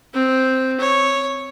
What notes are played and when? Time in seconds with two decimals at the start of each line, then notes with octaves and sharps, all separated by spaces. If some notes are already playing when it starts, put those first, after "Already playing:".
0.14 C4
0.80 C#5